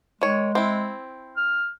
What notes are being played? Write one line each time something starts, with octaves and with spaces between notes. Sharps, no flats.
D#3 G#3 C#5
C4 E4
F6